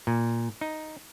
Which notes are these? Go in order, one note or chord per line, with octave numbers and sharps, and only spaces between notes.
A#2
D#4